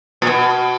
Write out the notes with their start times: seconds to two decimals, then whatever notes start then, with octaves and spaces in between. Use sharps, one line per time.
0.22 A#2
0.27 B2